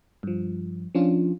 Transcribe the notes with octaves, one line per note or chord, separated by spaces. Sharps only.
G2 F3
F3 C#4 D4 F4